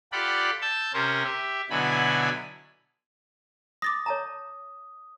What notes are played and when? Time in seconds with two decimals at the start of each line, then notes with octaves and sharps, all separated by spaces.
0.12 F4 G4 A4 D5 F#5 B5
0.62 A5 E6 G6
0.94 C3 C#4 A#4 C5
1.24 G4 E5
1.70 B2 D3 F#3 E4 G#5 B5
3.82 D6 D#6 A6 A#6
4.06 C#5 A5 A#5